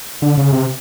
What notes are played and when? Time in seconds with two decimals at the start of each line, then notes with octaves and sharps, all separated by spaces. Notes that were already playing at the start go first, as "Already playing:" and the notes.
0.22 D3
0.37 C#3
0.52 C3